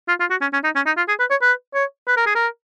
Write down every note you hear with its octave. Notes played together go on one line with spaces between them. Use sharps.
F4
F4
F#4
C#4
C#4
D#4
C#4
D#4
F4
G#4
B4
C#5
B4
C#5
B4
A#4
G#4
A#4